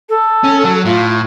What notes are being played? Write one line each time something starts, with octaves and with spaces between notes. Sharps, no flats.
A4
C#4
F#3
A2 F4